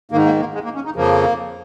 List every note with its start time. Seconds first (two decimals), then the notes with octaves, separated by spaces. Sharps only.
0.11 G#2 D#3 A#3
0.25 A#3
0.40 A#3
0.54 G#3
0.64 A#3
0.75 C#4
0.85 D#4
0.96 F2 C#3 F3 A#3